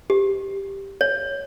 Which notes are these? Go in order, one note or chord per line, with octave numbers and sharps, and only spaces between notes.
G4
C#5